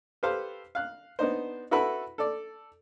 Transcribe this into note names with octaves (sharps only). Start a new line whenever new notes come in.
G4 A4 B4 C5 F5
F5 F#6
B3 D4 D#4 C5
E4 F#4 A4 B4 B5
A4 D5